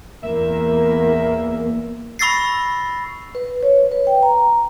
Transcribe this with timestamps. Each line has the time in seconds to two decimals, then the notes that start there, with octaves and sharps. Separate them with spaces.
0.24 E2 A#3 E5
2.19 B5 C#6 E6 A6 A#6 C7
3.35 B4
3.63 C#5
3.92 B4
4.07 G5
4.23 A#5